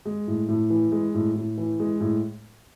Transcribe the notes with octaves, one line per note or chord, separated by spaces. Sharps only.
G#3
A2
A2
E3
G#3
A2
A2
E3
G#3
A2